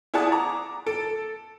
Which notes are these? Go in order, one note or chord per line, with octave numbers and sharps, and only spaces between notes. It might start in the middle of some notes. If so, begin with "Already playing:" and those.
E4 G#4 D5 F#5 A5 D#6
A#5 D6
A4 D7